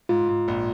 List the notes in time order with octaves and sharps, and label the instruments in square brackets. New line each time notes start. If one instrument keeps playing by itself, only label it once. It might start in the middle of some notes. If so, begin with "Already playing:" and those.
[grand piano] G#2 [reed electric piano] F4
[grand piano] G#2
A#1